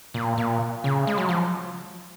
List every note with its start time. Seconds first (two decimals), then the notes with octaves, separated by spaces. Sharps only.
0.14 A#2
0.38 A#2
0.84 C#3
1.07 G#3
1.18 F#3
1.29 F3